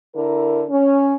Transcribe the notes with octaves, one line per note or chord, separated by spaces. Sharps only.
D3 E4 A#4
C#4